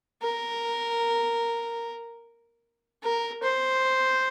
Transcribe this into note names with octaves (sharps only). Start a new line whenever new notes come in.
A#4
A#4
C5